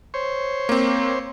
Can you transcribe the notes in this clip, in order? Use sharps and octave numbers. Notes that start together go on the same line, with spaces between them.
C5 C#5
A#3 C4